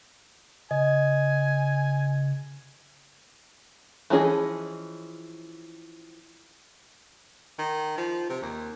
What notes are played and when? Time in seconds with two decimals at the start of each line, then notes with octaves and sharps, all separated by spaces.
0.71 C#3 D#5 G#5
4.10 E3 F3 C#4 G#4 D#5
7.58 D#3
7.97 F3
8.29 C3
8.42 D#2